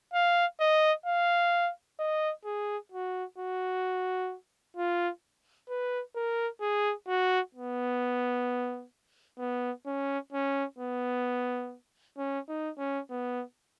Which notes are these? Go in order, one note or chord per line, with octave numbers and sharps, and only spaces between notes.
F5
D#5
F5
D#5
G#4
F#4
F#4
F4
B4
A#4
G#4
F#4
B3
B3
C#4
C#4
B3
C#4
D#4
C#4
B3